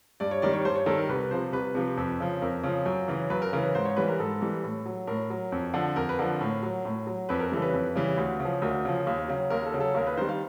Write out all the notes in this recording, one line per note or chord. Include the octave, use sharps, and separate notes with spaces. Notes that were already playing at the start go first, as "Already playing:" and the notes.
G2 D5
C#5
D#3 G3 D5
C#5
G2 C5
C#5
D#3 G3 A4
A#4
C2 B4
C3 F3 C5
C2 B4
C3 F3
F2
C#3 F3
F2 A#4
C#3 F3
F#2
C#3 E3
F#2 B4
A#4
C#3 E3 A#4
B4
G#2 C5
C#5
E3 G3 B4
A#4
G#2 A4
E3 G3
A2
F#3
A2 A#4
F#3
F2
D3 F3
F2 A#4
B4
D3 F3 A#4
A2
F#3
A2
F#3
F2 B4
A#4
C#3 E3 G3 A4
B4
F2
C#3 E3 G3
D2
C#3
F3
D2 A#4
C#3 F3
D#2
C#3 F#3
D#2 A#4
A4
C#3 F#3
A4
D#2 A#4
B4
D#3 G3 C5
F5